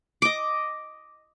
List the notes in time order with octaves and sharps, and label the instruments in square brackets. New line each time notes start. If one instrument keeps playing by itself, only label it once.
[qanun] D#5 D6